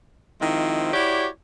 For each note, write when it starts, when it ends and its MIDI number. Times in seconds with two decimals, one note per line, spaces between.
0.41 0.90 51
0.41 0.90 53
0.41 0.90 56
0.41 0.90 60
0.41 0.90 64
0.94 1.27 64
0.94 1.27 66
0.94 1.27 67
0.94 1.27 73
0.94 1.27 74